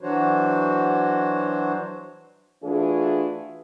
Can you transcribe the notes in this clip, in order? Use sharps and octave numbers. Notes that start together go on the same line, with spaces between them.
E3 F#3 D4 F#4 C5 C#5
E3 A3 D4 F4 F#4 G#4